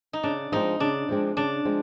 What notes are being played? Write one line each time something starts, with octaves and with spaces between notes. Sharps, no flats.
D#4
C#3 D4
F3 G#3 C4 D#4
C#3 D4
F3 G#3 C4
C#3 D4
F3 G#3 C4